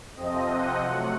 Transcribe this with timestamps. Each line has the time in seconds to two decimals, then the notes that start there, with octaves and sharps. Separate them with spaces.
0.14 F2 C3 F3 C4 D#5
0.48 F#5
0.82 C3 F#3 A3 F#5